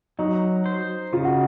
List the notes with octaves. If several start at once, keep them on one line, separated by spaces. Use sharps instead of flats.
F#3 D#4
C5
C#3 F4
F#4